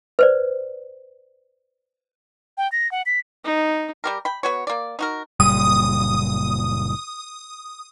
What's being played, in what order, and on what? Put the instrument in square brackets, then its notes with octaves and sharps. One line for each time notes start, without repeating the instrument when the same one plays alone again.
[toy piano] B4 C5 D5
[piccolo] G5
A#6
F#5
B6
[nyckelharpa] D#4
[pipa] G3 G4 A#4
G5 B5
B3 F#4 C#5
A#3 D5
D#4 F#4 A#4
[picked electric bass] F#1 A#2 G3 [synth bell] D#6